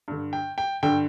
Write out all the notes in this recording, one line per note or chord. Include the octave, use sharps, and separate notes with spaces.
G2 D3
G5
G5
G2 D3 G5